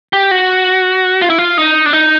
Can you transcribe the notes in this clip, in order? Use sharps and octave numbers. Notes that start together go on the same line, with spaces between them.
G4
F#4
F4
E4
F4
D#4
D4
D#4